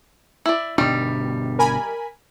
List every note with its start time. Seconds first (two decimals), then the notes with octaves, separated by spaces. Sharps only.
0.46 E4 D5
0.78 G1 B2 D#3 G3 D4
1.59 A#4 G#5 B5